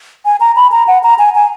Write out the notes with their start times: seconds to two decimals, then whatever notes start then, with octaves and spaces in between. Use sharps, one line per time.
0.25 G#5
0.40 A#5
0.56 B5
0.72 A#5
0.88 F#5
1.03 A#5
1.19 G#5
1.35 G#5